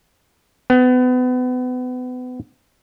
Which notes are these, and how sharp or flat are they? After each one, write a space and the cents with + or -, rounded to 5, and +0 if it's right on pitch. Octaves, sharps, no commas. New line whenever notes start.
B3 +30